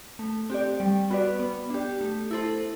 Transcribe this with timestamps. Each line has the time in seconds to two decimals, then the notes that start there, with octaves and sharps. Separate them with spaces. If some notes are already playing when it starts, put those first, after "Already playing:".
0.19 A3
0.50 C4 G4 D5
0.80 G3
1.10 B3 F#4 B4 D5
1.40 B3
1.70 D4 G4
2.01 A3
2.31 E4 A4 C5